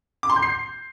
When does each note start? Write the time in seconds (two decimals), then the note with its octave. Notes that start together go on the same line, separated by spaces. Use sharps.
0.23 D6
0.30 C6
0.36 G6
0.42 C7